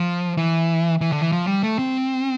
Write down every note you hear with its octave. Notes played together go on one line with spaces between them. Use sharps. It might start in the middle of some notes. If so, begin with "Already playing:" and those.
Already playing: F3
E3
E3
D3
E3
F3
G3
A3
C4